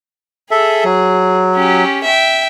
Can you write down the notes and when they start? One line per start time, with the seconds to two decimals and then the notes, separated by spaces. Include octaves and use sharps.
0.51 G#4 A4 E5
0.84 F#3
1.55 C#4 G4
2.04 E5 G5